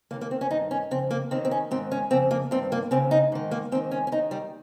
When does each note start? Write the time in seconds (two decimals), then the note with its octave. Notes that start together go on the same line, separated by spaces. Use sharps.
0.11 D#2 D#3 A#3
0.21 A#3
0.31 C4
0.41 C#4
0.51 G2 D#3 D#4
0.71 C#4
0.91 F2 C#3 C4
1.11 A#3
1.31 D#2 D#3 C4
1.45 C4
1.51 C#4
1.71 G#2 D#3 C4
1.91 C#4
2.11 F2 C#3 C4
2.31 A#3
2.51 G2 D#3 C4
2.72 A#3
2.91 D#2 C#3 C4
3.11 D#4
3.32 G#2 D#3
3.51 A#3
3.72 G#2 C4
3.75 D#3
3.91 C#4
4.07 C#4
4.12 D#2 D#3 D#4
4.31 G3